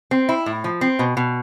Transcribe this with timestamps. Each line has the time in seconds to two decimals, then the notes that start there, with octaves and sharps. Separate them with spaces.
0.11 C4
0.29 E4
0.46 A2
0.64 F3
0.81 C4
0.99 B2
1.17 B2